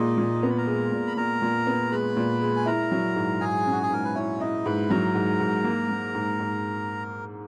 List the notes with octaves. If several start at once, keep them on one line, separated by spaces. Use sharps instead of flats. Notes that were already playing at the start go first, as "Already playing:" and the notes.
Already playing: A#2 G#3 D#4 D#5
A#2
B3 A#5
B5
A#4 A#5
G#3
A#2
B5
A#2 A#4 A#5
A#2
B3
G#3 B4 B5
A#2
G#3
G#5
E4 A#4 A#5
F#3
G#2
G#2 G#4 G#5
C#4
F#4
G#4
G#2 A#4
B4
C#4 E4 C#5
D#4 E4 D#5
G#2 B4 B5
F#3 A#4 A#5
G#2
G#2
A#3
A#3
G#2
G#2